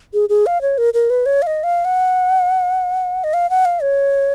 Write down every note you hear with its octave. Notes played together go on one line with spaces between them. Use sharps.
G#4
G#4
F5
C#5
A#4
A#4
B4
C#5
F5
D#5
F5
F#5
D#5
F5
F#5
F5
C#5